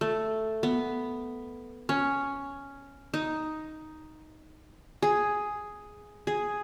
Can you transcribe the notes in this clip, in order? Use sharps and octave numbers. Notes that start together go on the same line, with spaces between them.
A3
B3
C#4
D#4
G#4
G#4